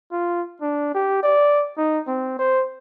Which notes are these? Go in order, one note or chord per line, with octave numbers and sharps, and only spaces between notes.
F4
D4
G4
D5
D#4
C4
C5